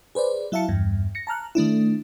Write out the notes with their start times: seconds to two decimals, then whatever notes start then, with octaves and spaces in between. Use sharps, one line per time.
0.15 G#4 B4 C5 D5
0.52 F#3 E4 E5 F5 A5 C#7
0.69 E2 G2
1.15 A#6 C#7
1.27 A5 A#5 F6 F#6
1.55 D#3 A3 D4 E4